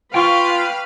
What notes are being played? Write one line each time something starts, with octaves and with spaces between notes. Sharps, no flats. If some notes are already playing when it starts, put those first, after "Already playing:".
F4 B4 F5 G5 C#6 D6